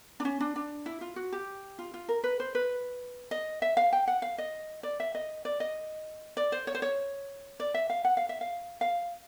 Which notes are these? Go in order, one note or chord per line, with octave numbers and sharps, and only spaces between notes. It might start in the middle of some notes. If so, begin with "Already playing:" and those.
D4
C#4
D4
D4
E4
F4
F#4
G4
F4
F4
A#4
B4
C5
B4
D#5
E5
F5
G5
F#5
F5
D#5
D5
E5
D#5
D5
D#5
D5
C5
C#5
C5
C#5
D5
E5
F5
F#5
F5
E5
F5
F5